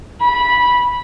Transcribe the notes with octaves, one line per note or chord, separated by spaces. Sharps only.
B5